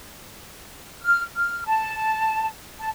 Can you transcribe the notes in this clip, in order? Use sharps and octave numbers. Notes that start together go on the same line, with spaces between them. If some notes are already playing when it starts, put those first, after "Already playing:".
F6
F6
A5
A5